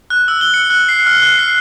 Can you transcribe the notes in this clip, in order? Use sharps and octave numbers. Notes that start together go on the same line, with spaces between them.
F#6
E6
G7
C#7
F#6
C7
F6
F#6
C7